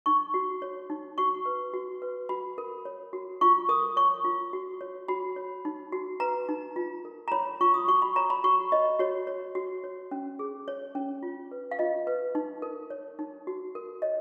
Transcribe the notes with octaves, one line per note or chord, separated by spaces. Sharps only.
D#4 C#6
F#4
C#5
D#4
F#4 C#6
B4
F#4
B4
F#4 B5
A#4
C#5
F#4
F4 C#6
A#4 D#6
C#5 C#6
F4
F#4
C#5
F#4 B5
C#5
D#4
F#4
B4 A#5
D#4
F4
A#4
A#5
C#5 B5
F4 C#6
D#6
F#4 C#6
B5
C#5 A#5
B5
F#4 C#6
C#5 D#5
F#4 C#5
C#5
F#4
C#5
C#4
G#4
C#5
C#4
F4
B4
F5
F4 D#5
B4
D#4
A#4
C#5
D#4
F#4
A#4
C#5 D#5